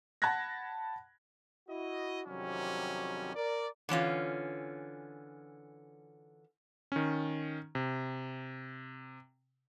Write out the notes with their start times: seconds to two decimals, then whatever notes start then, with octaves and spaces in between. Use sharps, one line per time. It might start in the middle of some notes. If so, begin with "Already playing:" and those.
0.22 F#5 A5 B5 F#6 G#6 A#6
1.68 E4 F#4 D#5
2.27 F2 C3 D#3 F#3 G3 C#4
3.35 A#4 D5
3.89 D3 E3 C#4 F4
6.92 D#3 C#4
7.75 C3